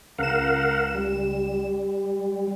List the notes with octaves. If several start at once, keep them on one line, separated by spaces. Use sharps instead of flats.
C#2 A#4 F5 F#5 E7
G3